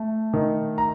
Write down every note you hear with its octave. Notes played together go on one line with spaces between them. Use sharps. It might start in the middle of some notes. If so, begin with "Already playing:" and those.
Already playing: A3
D#3
A#5